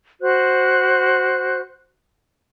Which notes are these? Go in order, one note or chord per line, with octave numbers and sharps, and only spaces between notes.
F#4 C5 F#6